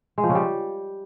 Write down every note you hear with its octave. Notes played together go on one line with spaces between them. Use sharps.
G#3
F3
C#3
G3